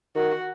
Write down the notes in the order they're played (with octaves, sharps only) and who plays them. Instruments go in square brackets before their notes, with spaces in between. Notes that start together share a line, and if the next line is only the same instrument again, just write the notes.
[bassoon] D#3 [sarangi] F#4